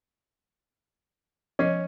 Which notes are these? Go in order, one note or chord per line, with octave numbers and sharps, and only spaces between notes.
F3 C#4 D#5